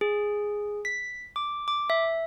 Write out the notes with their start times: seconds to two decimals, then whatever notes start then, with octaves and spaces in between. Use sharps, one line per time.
0.01 G#4
0.85 B6
1.36 D6
1.68 D6
1.90 E5